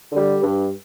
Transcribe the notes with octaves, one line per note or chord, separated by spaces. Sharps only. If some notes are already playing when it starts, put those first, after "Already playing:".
D3 G3
G2